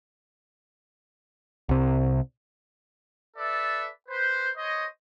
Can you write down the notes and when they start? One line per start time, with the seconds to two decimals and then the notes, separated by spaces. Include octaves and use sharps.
1.69 C2 C3
3.37 A4 B4 D5 E5
4.09 B4 C5
4.58 C5 C#5 D#5